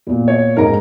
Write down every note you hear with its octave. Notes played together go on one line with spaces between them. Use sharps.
E2 A#2
C#5
G#2 G#3 D#4 A#4 D#5 A#5